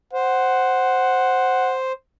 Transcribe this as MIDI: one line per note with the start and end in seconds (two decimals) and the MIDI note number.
0.13 1.92 72
0.13 1.77 78